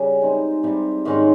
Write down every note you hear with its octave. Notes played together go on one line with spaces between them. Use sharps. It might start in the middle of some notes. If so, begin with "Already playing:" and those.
Already playing: C#3 G3 C#4 G#4
G#3 C4 D#4
C3 G3 C4
G#2 D#3 G#3 C#4